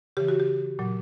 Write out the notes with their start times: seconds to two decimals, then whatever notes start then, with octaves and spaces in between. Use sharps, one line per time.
0.17 C#3 E3 G4
0.28 F#4
0.40 G4
0.79 A#2 F#3